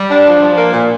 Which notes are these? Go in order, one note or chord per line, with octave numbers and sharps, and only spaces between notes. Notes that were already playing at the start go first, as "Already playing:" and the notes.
Already playing: G3
D4
F3
F3
A#3
A#2